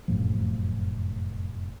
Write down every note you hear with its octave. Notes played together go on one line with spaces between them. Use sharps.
F1 F#2 A2 F3